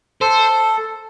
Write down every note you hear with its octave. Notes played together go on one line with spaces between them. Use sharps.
A4 C5